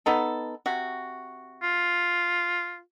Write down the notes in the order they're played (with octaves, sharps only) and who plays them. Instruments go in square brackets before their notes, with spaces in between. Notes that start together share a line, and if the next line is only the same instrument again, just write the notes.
[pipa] B3 D#4 A4
C3 F#4
[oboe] F4